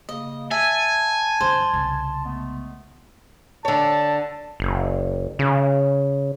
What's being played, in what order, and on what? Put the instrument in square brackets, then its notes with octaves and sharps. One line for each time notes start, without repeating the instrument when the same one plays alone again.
[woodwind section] C#3 A#3 [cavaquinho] D#5
[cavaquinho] E5 [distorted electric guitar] G#5 [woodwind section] A5
[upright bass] G2 D3 [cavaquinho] C5
[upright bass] C2 C#3
[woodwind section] G#3 A3 B3
[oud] D3 C#5 [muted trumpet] A5
[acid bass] F#1
C#3